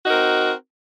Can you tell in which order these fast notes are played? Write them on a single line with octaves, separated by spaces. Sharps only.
F#4 D#4 A#4 C4